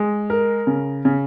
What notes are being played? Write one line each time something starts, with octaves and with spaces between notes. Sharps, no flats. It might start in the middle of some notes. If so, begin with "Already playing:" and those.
Already playing: G#3
A#4
C#3
C#3